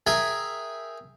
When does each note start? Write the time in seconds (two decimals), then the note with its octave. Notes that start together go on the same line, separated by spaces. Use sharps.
0.07 G#4 A#4 E5 G5 G#5